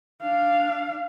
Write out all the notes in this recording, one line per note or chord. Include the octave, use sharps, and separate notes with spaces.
D4 F5